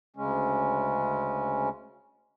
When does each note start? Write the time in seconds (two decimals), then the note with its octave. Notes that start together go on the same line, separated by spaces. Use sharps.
0.16 D2 C#3 G#3 C#4